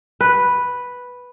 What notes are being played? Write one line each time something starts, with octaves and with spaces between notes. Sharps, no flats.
B4